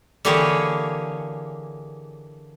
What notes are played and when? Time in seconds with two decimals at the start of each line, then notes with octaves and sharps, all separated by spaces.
0.25 D3 E3 A#3 G4 G#4 C#5